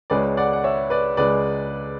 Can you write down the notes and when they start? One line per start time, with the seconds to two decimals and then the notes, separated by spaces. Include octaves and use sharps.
0.10 C#2 C#3 G#3 C#4 B4 D5
0.37 D5 F#5
0.53 F#5
0.64 C#5 E5
0.90 B4 D5
1.17 C#2 C#3 G#3 B4 D5